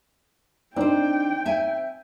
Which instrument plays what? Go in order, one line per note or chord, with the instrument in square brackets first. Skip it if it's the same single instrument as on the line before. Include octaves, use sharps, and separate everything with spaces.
[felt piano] C4 D#4 [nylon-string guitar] D4 C5 [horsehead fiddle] G5
[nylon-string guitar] E5 G#5